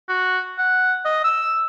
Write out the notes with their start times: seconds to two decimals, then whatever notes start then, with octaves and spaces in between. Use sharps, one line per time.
0.09 F#4
0.59 F#5
1.05 D#5
1.24 E6